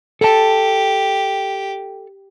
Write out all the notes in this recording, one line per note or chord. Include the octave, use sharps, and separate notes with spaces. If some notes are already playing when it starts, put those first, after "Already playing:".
G4 A4 A5